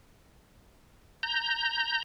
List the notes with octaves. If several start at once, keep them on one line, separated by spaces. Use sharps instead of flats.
A#5 G6